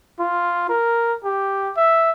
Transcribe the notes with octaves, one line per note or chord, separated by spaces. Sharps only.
F4
A#4
G4
E5